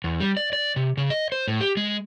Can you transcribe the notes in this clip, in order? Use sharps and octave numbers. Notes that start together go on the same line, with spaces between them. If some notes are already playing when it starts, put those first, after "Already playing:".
E2
G3
D5
D5
C3
C#3
D#5
C5
A2
G4
G#3